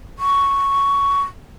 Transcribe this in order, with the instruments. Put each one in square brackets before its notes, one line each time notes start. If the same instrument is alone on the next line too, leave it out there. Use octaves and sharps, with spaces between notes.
[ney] C#6